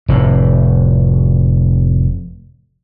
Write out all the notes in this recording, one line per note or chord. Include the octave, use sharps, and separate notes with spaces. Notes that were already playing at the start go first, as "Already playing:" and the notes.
F1 A2